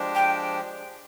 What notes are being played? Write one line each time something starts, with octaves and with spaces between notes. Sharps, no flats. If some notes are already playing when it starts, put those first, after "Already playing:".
Already playing: F3 G#3 D4 G4
G5